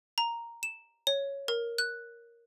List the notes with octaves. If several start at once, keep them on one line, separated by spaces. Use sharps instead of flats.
A#5
E7
C#5
A#4
F#6